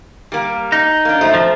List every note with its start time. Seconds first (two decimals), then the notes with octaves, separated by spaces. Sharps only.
0.32 G3 A#3
0.72 D#4
1.05 A#3 D4
1.21 F#2 A3 C5
1.34 F3